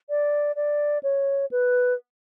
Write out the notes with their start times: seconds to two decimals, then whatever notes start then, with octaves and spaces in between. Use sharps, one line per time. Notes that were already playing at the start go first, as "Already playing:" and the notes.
0.10 D5
0.56 D5
1.03 C#5
1.51 B4